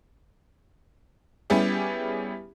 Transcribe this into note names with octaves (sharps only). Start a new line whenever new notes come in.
G3 B3 C#4 E4 G4 G#4